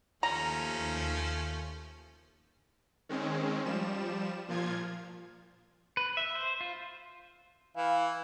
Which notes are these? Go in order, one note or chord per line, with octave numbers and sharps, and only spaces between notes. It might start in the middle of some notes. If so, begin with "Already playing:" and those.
D#2 F3 A3 C#4 A#5
D#3 G#3 C4 C#4
F3 G3 E7
A#2 F3 F4 G#6
B4
E5
C5
F4
E3 F5